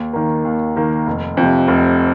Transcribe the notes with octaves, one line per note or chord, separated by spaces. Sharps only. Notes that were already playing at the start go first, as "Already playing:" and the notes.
Already playing: D#2
D#3 A#3
D#2
D#3 A#3
F1
F2
C3
F1